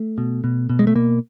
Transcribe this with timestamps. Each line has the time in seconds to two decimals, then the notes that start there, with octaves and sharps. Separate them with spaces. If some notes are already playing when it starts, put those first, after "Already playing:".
Already playing: A3
0.18 B2
0.44 B2
0.70 B2
0.79 G#3
0.87 A3
0.95 B2 A#3